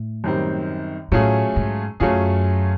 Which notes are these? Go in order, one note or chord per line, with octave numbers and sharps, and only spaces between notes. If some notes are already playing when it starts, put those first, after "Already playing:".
Already playing: A2
F#2 D#3 G3 C4
A2 F#3 A3 C#4 F4 G#4
G#2
F#2 F#3 A3 C#4 F4 G#4